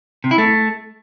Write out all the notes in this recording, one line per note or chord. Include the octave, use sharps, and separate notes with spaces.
C3
E4
A3